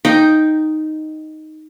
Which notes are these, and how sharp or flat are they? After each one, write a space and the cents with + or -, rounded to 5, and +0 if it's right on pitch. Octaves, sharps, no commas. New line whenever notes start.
D#4 +0 G5 +0